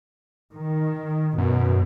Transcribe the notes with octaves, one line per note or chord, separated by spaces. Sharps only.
D#3
F#2 B2